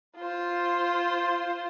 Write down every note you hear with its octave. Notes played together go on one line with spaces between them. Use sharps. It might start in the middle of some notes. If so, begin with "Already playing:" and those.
F4 C5